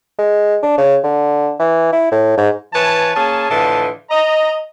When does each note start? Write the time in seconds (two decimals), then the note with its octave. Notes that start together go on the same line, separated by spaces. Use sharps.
0.19 G#3
0.63 D4
0.78 C#3
1.04 D3
1.60 E3
1.93 E4
2.11 A2
2.37 G#2
2.73 E3 B4 C#5 G#5 A5
3.14 A#3 C#4 G#4 A5
3.50 A2 D3 E3 F3 D#5 A5
4.11 D#5 A#5